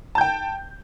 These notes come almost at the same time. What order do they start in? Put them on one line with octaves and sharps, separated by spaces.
A5 G6 G5